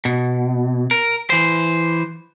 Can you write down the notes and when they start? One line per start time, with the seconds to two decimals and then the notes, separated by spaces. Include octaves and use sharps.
0.05 B2
0.91 A#4
1.30 E3 C5